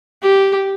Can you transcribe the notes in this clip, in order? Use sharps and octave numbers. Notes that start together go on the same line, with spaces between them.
G4